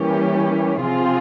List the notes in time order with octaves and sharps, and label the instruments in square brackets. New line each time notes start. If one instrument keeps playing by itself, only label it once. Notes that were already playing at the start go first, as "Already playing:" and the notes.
Already playing: [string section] E3 G3 A#3 C#4 G4
C3 F3 C4 F4 G#4